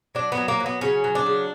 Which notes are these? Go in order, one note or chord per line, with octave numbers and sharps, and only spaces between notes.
F#3 D4
B3
F#3
A#3
F#3
B3
C#3 C#4
F#3
D4
C#3